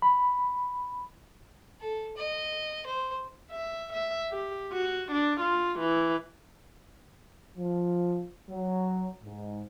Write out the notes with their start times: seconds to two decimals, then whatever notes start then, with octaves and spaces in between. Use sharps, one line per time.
0.02 B5
1.81 A4
2.17 D#5
2.86 C5
3.51 E5
3.93 E5
4.31 G4
4.72 F#4
5.12 D4
5.40 F4
5.79 E3
7.58 F3
8.49 F#3
9.23 G#2